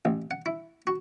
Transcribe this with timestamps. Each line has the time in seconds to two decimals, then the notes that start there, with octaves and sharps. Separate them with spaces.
0.05 A1
0.31 F#5
0.46 E4
0.87 F#4